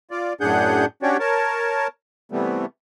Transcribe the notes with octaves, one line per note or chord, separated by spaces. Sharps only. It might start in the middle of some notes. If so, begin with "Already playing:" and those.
F4 D5
F#2 A2 D4 G#4 F#5 G6
C#4 D4 F#4 G4 C#5 D5
A#4 C#5 A5
C3 E3 G3 A3 B3